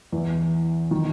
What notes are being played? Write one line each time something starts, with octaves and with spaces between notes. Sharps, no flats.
E2 E3
D#3